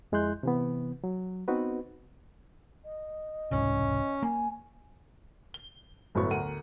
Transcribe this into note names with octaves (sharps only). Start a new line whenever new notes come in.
F2 G#3 E4 C6 F#6 G6
C3 E3 B3
F#3
B3 C4 D#4 F#4 B4
D#5
E1 C2 G#2 C#4
A#3 G#5
G7
G1 A2 F#3 B3 C#6
D2 A#4 F#5 D#7